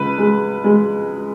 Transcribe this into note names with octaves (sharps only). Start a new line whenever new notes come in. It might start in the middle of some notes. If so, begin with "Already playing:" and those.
Already playing: C#2 B4
G#3
G#3